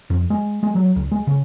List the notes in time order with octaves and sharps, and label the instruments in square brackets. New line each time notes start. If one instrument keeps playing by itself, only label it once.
[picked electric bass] F2
G#3
G#3
F#3
C#2
G#3
C#3